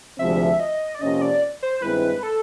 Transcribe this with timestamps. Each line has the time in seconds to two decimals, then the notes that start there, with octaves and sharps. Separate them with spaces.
0.19 D2 C3 F3 G#3 C4 E5
0.60 D#5
0.95 D5
1.01 F2 C3 F3 A#3 C#4 D#5
1.21 D5
1.63 C5
1.82 G2 D#3 G#3 C4 E4 B4
2.23 A4